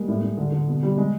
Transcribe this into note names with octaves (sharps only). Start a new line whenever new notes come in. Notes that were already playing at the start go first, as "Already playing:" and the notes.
Already playing: G3 G#3 A#3
A2
A2
D3
D3
B2
G3
G#3